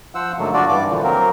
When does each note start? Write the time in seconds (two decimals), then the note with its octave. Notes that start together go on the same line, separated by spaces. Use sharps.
0.15 F3 C5 F#5 E6
0.38 G#2 D3 F#3 A3 A#3
0.54 D4 F4 F#4 D5
0.69 G2 E3 G3 D5 D6
0.89 A#2 D3 E3 F3
1.04 F#3 A#3 C4 A#4